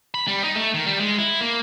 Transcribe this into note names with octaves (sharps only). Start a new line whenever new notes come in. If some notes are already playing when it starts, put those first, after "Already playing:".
B5
G3
D#4
A3
D#3
G3
G#3
E4
A#3